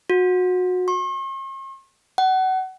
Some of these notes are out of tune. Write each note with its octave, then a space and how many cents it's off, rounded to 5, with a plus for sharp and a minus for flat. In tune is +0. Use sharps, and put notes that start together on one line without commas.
F#4 -25
C#6 -45
F#5 +25